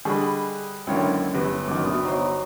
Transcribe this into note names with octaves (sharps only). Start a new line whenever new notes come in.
D3 G3 G#4 B4 D#5 B5 C#6
C#2 F#2 D3 A#3 C4 E4 C#5
G1 B4
F#2 D#3 D6
D2 C3 B3
F#3 D#4 C5